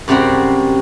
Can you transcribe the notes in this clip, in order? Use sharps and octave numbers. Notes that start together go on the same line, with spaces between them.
F#2 C3 G3 C4 F#4